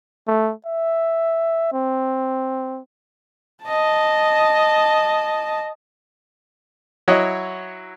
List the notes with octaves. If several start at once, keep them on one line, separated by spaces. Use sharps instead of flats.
A3
E5
C4
D#5 A5
F#3 E4 C#5 D#5 F#5